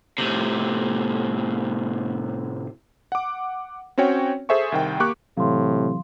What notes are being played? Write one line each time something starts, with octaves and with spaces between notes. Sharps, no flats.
A2 C3
F#5 D6
C4 C#4 F#4 C#5 G5
G#4 A4 C5 E5 G#5 C#6
C2 D#3 G5
A#3 G4 C#6 D6 F#6
A2 C3 E3 F#3 F5 C6